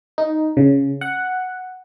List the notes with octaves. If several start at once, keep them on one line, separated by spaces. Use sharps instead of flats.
D#4
C#3
F#5